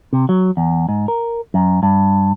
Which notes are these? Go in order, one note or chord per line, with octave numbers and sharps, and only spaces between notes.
C3
F#3
E2
G#2
A#4
F#2
G2